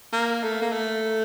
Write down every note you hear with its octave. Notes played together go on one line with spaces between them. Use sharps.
A#3
A3
A#3
A3